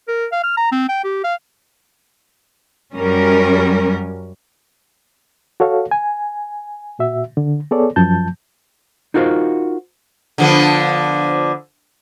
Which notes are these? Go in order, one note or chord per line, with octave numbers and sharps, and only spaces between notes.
A#4
F5
F6
A#5
C4
G5
G4
F5
F#2 G3 C#4 A#4
F#4 A4 C#5 F5
G#5
A#2 F#4 E5
D3
B3 G#4 A4 C#5 D5
F#2 F3 A5 G6
D#4 F4 F#4 A#4 C5 F5
D3 F3 B3